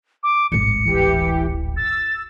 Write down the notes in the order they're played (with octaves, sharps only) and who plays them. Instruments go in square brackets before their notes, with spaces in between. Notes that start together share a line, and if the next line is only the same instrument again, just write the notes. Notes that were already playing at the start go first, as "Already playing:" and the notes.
[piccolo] D6
[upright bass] D1 G#1 [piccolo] C#7
[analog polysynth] E3 G4
[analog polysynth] E6 [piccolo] A6